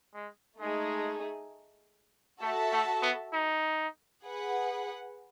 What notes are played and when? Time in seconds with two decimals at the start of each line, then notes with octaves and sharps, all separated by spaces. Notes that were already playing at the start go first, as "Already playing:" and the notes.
0.14 G#3
0.60 G#3 A3 D#4 G#4
2.42 A3 F#4 A4 E5 A5
2.73 A3
3.02 B3
3.33 D#4
4.24 G#4 B4 F#5